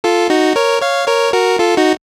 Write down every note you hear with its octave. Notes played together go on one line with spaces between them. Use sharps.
F4 A4
D#4 F#4
A#4 C#5
C#5 F5
A#4 C#5
F#4 A#4
F4 A4
D#4 F#4